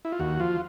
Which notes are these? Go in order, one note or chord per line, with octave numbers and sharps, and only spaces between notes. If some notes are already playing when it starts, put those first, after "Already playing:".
E4
F4
D#2 F#4
F3 F4